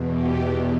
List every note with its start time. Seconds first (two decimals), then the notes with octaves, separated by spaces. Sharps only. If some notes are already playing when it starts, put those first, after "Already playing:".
Already playing: E2 B2
0.14 G4